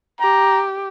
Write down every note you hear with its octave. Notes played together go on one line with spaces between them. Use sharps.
G4 A#5